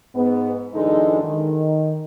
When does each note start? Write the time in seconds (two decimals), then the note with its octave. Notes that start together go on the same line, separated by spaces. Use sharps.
0.15 G#2 B3
0.74 F#2 D3 E3 G#3 D#4 A4
1.23 D#3